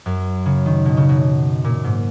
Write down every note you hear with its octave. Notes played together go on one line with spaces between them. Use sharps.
F#2
C#3
D#3
B2
C#3
B2
A#2
G#2